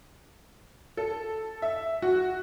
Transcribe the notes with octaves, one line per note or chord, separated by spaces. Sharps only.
A4
E5
F#4